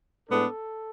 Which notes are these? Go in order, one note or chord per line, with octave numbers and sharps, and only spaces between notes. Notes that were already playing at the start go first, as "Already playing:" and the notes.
A2 G#3 B3 D4 A4